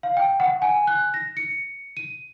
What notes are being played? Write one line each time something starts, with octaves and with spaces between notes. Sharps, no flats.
F5
G5
F#5
G#5
F#6
A#6
C#7
D#7